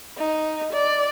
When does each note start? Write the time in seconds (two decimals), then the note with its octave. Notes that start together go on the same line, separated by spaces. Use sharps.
0.18 D#4
0.73 D5